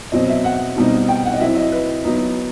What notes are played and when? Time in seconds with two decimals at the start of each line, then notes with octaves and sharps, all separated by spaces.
0.12 B2 F#3 C4 D#5
0.29 E5
0.44 F#5
0.76 B2 G3 C4 D#4
1.09 G5
1.25 F#5
1.34 D#5
1.40 F#3 C4 E4 E5
1.56 D#5
1.72 B4
2.05 F#3 B3 D#4